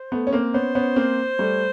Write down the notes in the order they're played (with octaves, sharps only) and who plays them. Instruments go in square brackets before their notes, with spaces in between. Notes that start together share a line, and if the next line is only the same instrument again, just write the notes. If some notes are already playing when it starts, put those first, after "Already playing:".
Already playing: [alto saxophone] C5
[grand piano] A3 B3
C#4
A#3 C4
[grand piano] B3 C#4 [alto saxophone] C5
[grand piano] B3 C#4
A#3 C4
G3 A3